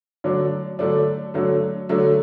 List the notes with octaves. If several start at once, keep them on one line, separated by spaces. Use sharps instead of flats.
D3 F#3 A3 D4
D3 F#3 A3 D4
D3 F#3 A3
D3 F#3 A3